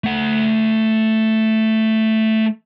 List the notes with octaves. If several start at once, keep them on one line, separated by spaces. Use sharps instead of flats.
A3 F#5